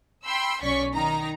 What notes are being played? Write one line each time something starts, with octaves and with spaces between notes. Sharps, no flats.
G5 B5 C6 E6
B1 C#4 D5 C#6 B6
D#3 D#4 A#5